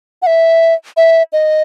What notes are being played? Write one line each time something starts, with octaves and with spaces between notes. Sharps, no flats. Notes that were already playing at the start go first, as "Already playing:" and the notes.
F#5
E5
E5
D#5